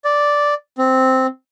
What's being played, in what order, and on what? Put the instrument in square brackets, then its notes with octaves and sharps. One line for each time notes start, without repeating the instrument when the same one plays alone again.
[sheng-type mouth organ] D5
C4